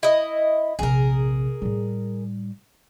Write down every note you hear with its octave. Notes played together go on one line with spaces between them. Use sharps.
E4 D#5
A#1 C3 G#4 A#4
A2 G3